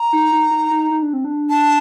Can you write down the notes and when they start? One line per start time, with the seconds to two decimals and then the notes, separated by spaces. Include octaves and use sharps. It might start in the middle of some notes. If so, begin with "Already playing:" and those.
Already playing: A#5
0.13 D#4
0.32 D#4
0.51 D#4
0.71 D#4
0.91 D#4
1.02 D4
1.13 C4
1.25 D4
1.49 A5